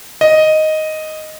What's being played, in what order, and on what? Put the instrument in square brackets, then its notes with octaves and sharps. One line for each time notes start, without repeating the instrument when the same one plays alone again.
[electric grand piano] D#5